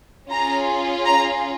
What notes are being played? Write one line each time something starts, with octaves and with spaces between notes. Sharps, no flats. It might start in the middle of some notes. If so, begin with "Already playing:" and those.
C#4 F4 G#4 A#5
A#5